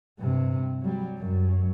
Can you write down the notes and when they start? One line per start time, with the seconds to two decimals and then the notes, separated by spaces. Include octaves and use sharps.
0.19 G2 C3
0.82 F#3 G3
1.19 F#2